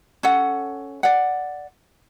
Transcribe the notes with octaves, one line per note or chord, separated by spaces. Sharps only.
C#4 A4 F#5
D5 F#5